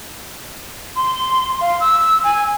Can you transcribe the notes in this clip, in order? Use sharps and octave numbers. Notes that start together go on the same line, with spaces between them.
C6
F5
E6
G#5